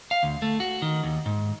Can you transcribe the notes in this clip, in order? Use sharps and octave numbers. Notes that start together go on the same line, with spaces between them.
F5
D2
A3
F#4
D#3
D#2
G#2